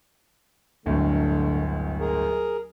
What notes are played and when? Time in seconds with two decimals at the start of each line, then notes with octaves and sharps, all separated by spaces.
0.86 D1 G1 D2 D3 A3
2.00 G#4 A#4